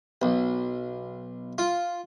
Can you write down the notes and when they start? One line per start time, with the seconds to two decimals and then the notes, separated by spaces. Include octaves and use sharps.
0.22 B1
1.58 F4